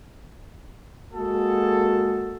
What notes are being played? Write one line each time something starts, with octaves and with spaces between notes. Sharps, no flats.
G#3 A#3 F#4 G#4 A4